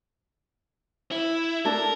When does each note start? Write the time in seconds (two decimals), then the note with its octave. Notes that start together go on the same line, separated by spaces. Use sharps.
1.12 E4
1.65 D4 A4 A#4